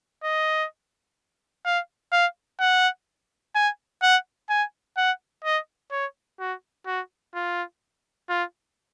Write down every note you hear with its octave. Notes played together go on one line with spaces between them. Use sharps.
D#5
F5
F5
F#5
G#5
F#5
G#5
F#5
D#5
C#5
F#4
F#4
F4
F4